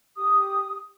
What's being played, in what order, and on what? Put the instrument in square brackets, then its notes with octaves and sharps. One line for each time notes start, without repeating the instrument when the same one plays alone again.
[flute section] G4 D#6